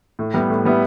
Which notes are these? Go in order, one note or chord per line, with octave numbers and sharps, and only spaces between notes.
A2
G3 B3 E4
A2
G3 B3 E4